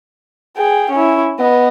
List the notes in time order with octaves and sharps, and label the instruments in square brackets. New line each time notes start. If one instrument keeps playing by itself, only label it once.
[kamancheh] G#4 G5
C#4 E4
[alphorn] B3 [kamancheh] D#5